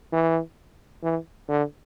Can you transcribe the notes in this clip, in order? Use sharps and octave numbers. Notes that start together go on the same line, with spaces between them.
E3
E3
D3